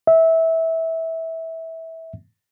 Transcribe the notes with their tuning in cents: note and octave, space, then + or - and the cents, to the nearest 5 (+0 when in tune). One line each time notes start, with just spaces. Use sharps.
E5 -20